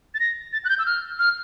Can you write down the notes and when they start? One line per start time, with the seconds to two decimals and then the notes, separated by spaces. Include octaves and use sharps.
0.14 A6
0.20 A#6
0.53 A6
0.64 F#6
0.69 G6
0.79 E6
0.86 F6
1.19 F6